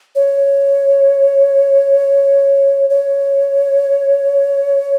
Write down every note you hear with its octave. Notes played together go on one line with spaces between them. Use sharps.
C#5
C#5